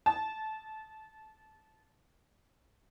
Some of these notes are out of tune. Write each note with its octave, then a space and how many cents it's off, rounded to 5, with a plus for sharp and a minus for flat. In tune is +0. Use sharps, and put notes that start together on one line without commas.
A5 -20